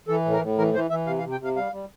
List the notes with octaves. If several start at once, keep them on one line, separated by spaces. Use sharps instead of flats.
E3 A4
A2
A#4
A2
E3 A#4
E3 C5
E3 E5
C3 F5
F5
C3
G5
C3 F5
G3 F5
G3